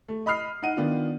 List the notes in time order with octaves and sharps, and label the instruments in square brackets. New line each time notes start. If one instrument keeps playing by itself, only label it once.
[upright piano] A3
D#5 B5 D#6 F6 C7
D#4 D#5 F#5 D#7
D#3 B3 D4 F4